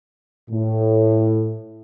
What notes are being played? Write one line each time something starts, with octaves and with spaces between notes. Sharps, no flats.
A2